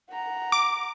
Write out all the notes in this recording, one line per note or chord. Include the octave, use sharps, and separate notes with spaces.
F#5 A#5
D6